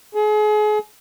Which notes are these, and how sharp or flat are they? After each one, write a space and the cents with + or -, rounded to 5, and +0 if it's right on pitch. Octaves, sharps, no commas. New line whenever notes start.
G#4 +35